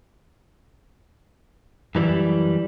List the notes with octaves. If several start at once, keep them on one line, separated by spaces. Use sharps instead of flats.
F#2 E3 G3